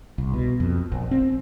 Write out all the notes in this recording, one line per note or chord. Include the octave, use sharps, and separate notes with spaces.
C2
B2
F2
A#1
C4